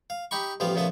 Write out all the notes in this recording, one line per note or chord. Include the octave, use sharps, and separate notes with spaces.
F5
D#4 G4 B5 C#6
A1 F3 G3 B3 F5
A#2 C#3 F3 A3 B3 D#6